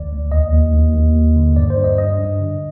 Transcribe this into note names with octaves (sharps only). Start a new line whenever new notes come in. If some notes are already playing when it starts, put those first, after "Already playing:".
Already playing: D2 D#3 D5
D2
D#2 D#5
D#2
D#2
D#2
D#2
D3
G2 D5
C5
G2
D#5
G2 D#5
G2
D3